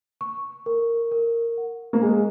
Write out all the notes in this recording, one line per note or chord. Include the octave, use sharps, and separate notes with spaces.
C#6
A#4
A#4
F#5
A#3
G#3 G#5